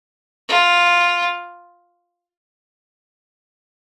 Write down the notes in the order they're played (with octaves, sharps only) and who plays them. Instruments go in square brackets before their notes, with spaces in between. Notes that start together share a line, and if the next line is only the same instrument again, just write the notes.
[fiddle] F4